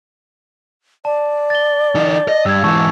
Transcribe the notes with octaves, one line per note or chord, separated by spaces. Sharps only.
D5 A5
A6 G7
E3 D#4
D#5
G2 E6 G#6
G#2 E3 A5 C#6 E6